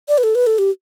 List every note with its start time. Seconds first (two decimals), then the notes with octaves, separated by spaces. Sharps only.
0.08 D5
0.18 B4
0.23 A4
0.35 B4
0.47 A4
0.58 G4